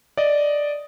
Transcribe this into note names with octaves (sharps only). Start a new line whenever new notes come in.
D5 D#5